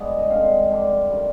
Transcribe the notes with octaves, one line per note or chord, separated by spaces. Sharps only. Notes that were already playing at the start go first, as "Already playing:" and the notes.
Already playing: G2 F3 G#3 B3
D#5
D3 G#3 C4 F5
G2 D3 F3
D#3 G3